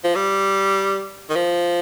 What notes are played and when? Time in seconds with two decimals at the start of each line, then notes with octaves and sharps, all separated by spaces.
0.04 F3
0.15 G3
1.30 D#3
1.36 F3